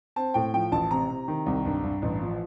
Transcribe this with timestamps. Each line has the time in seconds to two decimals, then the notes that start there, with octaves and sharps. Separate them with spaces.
0.16 C4 A5
0.34 A2 G5
0.54 F3 G5
0.72 A1 A5
0.91 C3 A#5
1.10 C3
1.28 D#3
1.46 C2
1.65 G2
1.83 G2
2.02 A1
2.22 F3